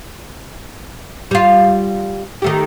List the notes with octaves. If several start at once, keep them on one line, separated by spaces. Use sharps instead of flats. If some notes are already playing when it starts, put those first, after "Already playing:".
G3 F4
D#3 A3 G4